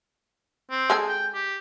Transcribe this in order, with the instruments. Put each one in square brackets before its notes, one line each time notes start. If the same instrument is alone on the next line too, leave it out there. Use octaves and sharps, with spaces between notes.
[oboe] C4
[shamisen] G#3 G#4 A4
[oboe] G5
G4